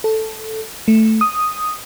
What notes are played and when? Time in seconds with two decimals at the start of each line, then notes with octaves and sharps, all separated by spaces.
0.04 A4
0.88 A3
1.21 D#6